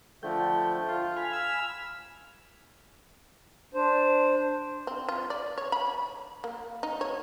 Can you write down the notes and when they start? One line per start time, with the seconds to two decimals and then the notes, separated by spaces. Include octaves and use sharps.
0.23 D3 F3 A3 A4 G5
0.87 F4
1.17 G#5 B5 F6
1.32 E6
3.74 D4 C5
4.87 C4
5.09 F4
5.30 D5
5.58 C#5
5.72 B5
6.44 A#3
6.83 D#4
7.01 C#5